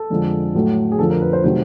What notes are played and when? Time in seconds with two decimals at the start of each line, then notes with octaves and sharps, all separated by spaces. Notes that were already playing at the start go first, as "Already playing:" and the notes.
Already playing: A4
0.10 F2 D3 F3 G#3
0.55 A2 F#3 A3
0.92 G#4
0.99 F2 D3 F3 A4
1.10 A#4
1.21 B4
1.33 C5
1.44 C3 D#3 F#3 A3 C5